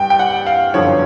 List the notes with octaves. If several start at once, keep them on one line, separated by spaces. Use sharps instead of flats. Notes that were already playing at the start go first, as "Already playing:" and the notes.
Already playing: G2 G3 G5
G5
F#5
F5
G1 F#2 D3 F3 C#5